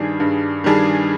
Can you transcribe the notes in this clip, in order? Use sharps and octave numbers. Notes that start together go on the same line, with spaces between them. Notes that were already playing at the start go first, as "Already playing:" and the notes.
Already playing: G2 D#3 G3 D4 G#4
G2
D#3 G3 D4 G#4